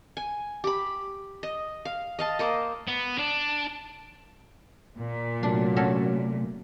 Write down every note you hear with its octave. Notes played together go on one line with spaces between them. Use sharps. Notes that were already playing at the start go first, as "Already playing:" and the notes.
G#5
G4 B5
D#5
F5
D#5 F5 A5
A#3 C5 D#5
B3
D4
A#2
C3 F#3 A3 D4
C#4 F#4 A4